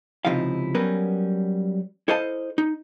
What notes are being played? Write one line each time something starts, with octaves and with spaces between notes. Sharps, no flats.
C#2 C3 F3 D#4 E4 F5
F#3 G3 B3 C#4 A#4 B4
E4 A4 C5 D#5 F5 A5
D#4